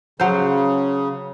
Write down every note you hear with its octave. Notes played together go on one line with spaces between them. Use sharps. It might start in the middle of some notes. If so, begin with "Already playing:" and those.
C#3 F#3 C5